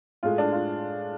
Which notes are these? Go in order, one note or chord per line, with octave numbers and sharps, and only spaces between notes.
A2 G#3 F4
D4
F4